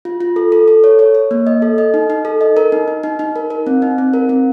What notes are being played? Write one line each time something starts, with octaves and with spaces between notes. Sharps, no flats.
F4
F4
A4
A4
A4
C#5
C#5
C#5
A#3
D#5
A4
D#5
D#4
D#4
A4
D#5
A#4
D#4
D#4
D#4
D#4
A#4
A#4
C4
D#4
C4
A#4
C4